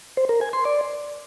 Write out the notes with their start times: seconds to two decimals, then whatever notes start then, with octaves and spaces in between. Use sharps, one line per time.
0.17 C5
0.29 A#4
0.41 G#5
0.53 C6
0.65 D5